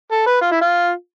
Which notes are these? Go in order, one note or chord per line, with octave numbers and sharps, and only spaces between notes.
A4
B4
F4
E4
F4